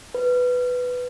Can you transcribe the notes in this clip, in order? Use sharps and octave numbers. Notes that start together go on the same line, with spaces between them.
B4